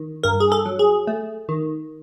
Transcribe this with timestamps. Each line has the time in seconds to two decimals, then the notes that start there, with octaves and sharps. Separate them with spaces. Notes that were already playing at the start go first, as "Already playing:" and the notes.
Already playing: D#3
0.23 G2 A#4
0.40 G#4
0.52 A4
0.66 F#3
0.79 G#4
1.07 A3
1.49 D#3